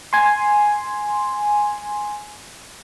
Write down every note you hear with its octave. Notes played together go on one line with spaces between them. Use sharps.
G#5 C6